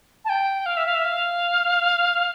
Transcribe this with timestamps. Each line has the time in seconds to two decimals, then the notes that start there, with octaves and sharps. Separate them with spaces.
0.25 A5
0.29 G5
0.66 F5
0.77 E5
0.86 F5
0.95 E5
1.04 F5